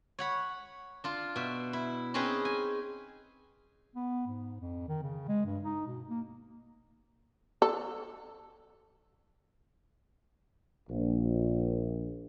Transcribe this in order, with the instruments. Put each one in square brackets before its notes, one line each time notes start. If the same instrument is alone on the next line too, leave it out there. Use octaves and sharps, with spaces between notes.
[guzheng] C#5 F#5 B5
D4 F4
B2 E5
E4
C4 C#4 D#4 G#4 B4
G#5
[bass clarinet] B3
G#2
F2
D#3
C#3
G#3
G2
D#4
B2
A#3
[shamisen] A4
[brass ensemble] A#1